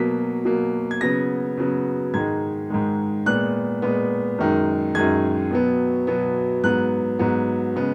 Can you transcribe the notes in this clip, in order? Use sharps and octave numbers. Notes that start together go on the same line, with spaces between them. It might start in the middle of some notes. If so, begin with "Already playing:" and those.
Already playing: B2 F#3 A#3 B6
B2 F#3 A#3
G#6
C#3 F#3 B3 A#6
C#3 F#3 B3
G#2 D#3 G#3 G#6
G#2 D#3 G#3
A#2 G#3 B3 F#6
A#2 G#3 B3
F#2 D#3 G#3
F#2 D#3 G#3 G#6
B2 F#3 B3
B2 F#3 B3
G#2 F#3 B3 F#6
G#2 F#3 B3
C#3 G#3 B3